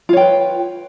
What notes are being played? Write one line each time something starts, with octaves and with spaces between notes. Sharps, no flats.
F4 B4 C#5 G5